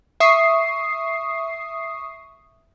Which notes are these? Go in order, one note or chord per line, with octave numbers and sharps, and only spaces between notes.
E5 C#6 D#6 C7